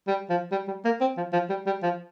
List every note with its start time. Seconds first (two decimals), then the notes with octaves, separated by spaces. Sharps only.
0.07 G3
0.29 F3
0.51 G3
0.68 G3
0.85 A#3
1.01 C4
1.17 F3
1.33 F3
1.49 G3
1.66 G3
1.82 F3